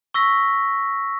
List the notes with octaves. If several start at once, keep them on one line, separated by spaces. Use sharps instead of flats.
C#6 E6 A#6 B6